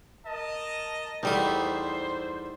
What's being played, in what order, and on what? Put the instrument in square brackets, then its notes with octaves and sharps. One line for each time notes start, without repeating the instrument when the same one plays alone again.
[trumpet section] A#4 D#5 A5
[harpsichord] E2 A3 E4 [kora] G3 D#4 [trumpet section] C5